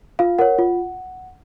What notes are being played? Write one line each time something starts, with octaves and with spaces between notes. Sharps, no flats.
F4 F5
A#4 C#5 F#5
F4